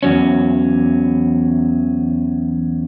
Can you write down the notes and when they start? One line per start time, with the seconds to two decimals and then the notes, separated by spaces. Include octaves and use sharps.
0.03 E2 F#3 C#4